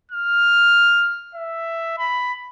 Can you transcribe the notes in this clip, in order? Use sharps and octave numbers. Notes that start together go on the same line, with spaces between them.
F6
E5
B5